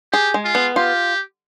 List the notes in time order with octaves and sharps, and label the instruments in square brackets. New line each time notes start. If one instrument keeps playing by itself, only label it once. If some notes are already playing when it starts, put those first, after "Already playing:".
[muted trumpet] G4 [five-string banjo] G#4
[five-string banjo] G#3
[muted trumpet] F4
[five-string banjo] B3
[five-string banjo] F4 [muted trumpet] G4